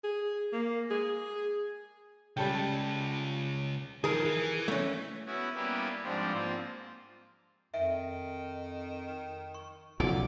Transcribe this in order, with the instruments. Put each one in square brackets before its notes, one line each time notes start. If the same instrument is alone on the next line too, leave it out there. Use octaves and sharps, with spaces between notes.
[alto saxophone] G#4
A#3
G#4
[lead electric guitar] C#3 G#3 [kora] G3 A4 G5
[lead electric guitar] D#3 F3 [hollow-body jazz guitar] G#4 A#4
[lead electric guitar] E3
[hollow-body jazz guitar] A3 C#4
[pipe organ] B3 C#4 E4 F#4
G3 A#3 B3 C#4 E4 G4
G#2 F3 G3 C4 D4
A#3 C4 F4
[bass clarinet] F2 [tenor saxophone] D#3 [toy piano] E5
[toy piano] C#6
[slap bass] B1 C#3 F3 [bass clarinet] F#4 [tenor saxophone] D5